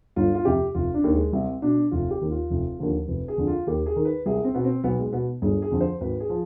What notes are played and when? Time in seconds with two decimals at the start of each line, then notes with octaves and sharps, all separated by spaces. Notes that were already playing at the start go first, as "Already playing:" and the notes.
0.16 G1 F4
0.35 F4
0.45 F2 C3 G4
0.75 F1 F4
0.94 D4
1.04 D#2 D#3
1.14 G#3
1.33 C2 C4
1.62 B2 D4
1.91 F1 F4
2.11 G4
2.21 D#2 D#3
2.30 F4
2.50 F1
2.79 D#2 D3 F3
3.08 F1 B4
3.28 G#4
3.38 F2 D3
3.47 F4
3.67 D#2 G4
3.86 G#4
3.96 D#3
4.05 B4
4.26 C2 G#4
4.44 C4
4.54 B2 B3
4.64 C4
4.83 B1 B3
4.99 G#3
5.12 B2 B3
5.42 G1 G#4
5.62 G#4
5.71 F2 D3 F3
5.81 C5
6.01 G#1 B4
6.20 G#4
6.30 F3